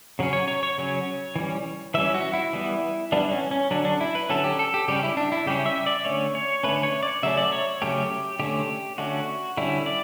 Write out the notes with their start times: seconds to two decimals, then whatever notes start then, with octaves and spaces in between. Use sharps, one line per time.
0.19 C#3 F#3 C#4
0.33 C#5
0.48 C#5
0.63 C#5
0.78 C#3 F#3 C#4
1.36 E3 G3 C#4
1.94 E3 G3 C#4 E5
2.14 F#4
2.33 E4
2.53 E3 G3 B3
3.12 E3 G3 B3 D4
3.31 C#4
3.51 C#4
3.71 D3 F#3 C#4 D4
3.85 D4
4.01 E4
4.15 B4
4.30 D3 F#3 C#4 A4
4.44 G4
4.59 A4
4.74 G4
4.88 C#3 G3 C#4 G4
5.03 E4
5.17 D4
5.32 E4
5.46 C#3 G3 C#4 G4
5.66 E5
5.86 D5
6.05 D3 A3 C#4 C#5
6.35 C#5
6.63 D3 A3 C#4 B4
6.83 C#5
7.03 D5
7.23 C#3 F#3 A3 C#4 E5
7.37 D5
7.52 C#5
7.82 C#3 F#3 A3 C#4 G4
8.39 D3 A3 C#4 G4
8.98 D3 A3 C#4 F#4
9.57 D3 G3 C#4 E4
9.86 D5